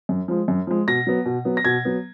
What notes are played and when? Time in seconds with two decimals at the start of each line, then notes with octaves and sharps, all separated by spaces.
0.09 F#2
0.28 F3 G#3
0.48 F#2
0.67 F3 G#3
0.87 B2 A#6
1.07 F#3 B3
1.26 B2
1.45 F#3 B3
1.57 A#6
1.65 B2 G#6
1.85 F#3 B3